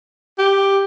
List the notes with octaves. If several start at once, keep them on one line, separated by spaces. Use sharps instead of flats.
G4